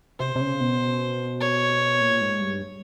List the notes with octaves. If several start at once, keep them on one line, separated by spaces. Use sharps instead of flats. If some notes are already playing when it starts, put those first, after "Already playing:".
C3 C5
C3
C#3
B2
C#5
A#2
G#2
G2